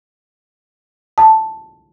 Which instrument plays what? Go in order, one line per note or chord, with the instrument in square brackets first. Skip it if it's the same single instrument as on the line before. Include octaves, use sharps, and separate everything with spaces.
[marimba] A5